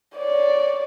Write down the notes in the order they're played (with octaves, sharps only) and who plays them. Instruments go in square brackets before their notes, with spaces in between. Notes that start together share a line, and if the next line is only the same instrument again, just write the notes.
[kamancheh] C#5 D5